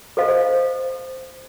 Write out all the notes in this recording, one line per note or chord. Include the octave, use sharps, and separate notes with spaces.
A4 C5 D#5 F5